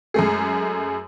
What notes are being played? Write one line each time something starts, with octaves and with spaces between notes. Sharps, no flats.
F#2 G#3 A3 G#4